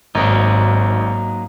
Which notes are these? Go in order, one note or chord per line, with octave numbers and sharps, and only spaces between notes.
G#1 G#2 F#3 A#3 D#4